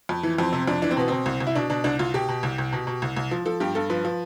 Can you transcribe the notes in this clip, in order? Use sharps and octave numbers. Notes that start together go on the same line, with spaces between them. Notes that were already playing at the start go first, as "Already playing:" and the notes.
F2
E3
F2 C4
C3 C4
F2 D4
E3 D4
C4
B2 B3
B2 C4
C2
C2
E4
B2 D4
B2 D4
C2 D4
C2 F4
B2 G4
B2
C2
C2
B2
B2
C2
C2
F3
F3 A4
G2 G4
G2 A4
F3 B4
F3